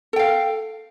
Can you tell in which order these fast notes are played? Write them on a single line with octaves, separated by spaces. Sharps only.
A4 G5 F5